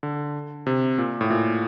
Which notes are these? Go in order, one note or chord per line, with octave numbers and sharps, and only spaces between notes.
D3
C3
A#2
A2
A#2